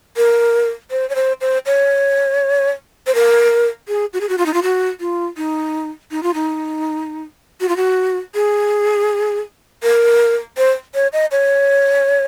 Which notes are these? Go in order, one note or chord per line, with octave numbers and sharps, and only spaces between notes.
A#4
C5
C#5
C5
C5
C#5
C5
A#4
G#4
F#4
G#4
F#4
F4
D#4
F4
F#4
F4
D#4
D#4
F4
D#4
F#4
F4
F#4
G#4
A#4
C5
C#5
D#5
C#5